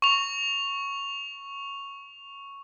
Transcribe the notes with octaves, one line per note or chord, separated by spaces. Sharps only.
C#6 F7